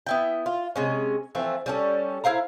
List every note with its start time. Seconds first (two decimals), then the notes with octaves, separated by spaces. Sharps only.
0.07 B3 E4 G5
0.46 F4
0.76 C3 G#3 C#4
1.35 E3 F3 A3 C4
1.66 G3 C#4 A4
2.24 E4 C5 F5 A#5